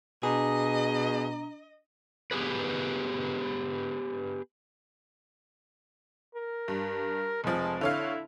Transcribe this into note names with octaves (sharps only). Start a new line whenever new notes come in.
B2 D4 G#4 D#5 A#5
B3 G4 G#4 B4
A#4
G2
F1 F3 G#3
D3 E4 C#5 F5